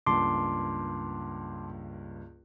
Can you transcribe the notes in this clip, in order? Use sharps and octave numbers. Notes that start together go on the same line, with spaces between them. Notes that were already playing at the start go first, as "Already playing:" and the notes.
C#2 G2 A#3 A5 C6 D6